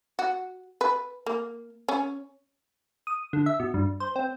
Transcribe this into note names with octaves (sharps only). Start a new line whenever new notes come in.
F#4
B4
A#3
C#4
D#6
D3
E5
B2
G2
C5
C4